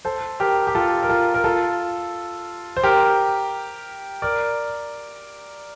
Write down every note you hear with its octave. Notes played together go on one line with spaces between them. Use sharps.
A4 C5
G4 A#4
G4
F4 A4
A#4
F4 A4
A#4
F4 A4
C5
G4 A#4
A#4 D5